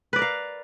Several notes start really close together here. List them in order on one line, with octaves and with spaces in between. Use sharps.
B4 D5 A#4 F5